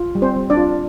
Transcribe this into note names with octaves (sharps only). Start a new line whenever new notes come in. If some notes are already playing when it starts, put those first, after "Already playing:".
Already playing: F4
G3
C4 C5
G3
D4 D5
F4